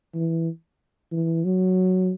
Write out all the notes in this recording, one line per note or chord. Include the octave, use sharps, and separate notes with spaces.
E3
E3
F#3